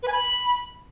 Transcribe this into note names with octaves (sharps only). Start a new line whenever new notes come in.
B4
G#5
B5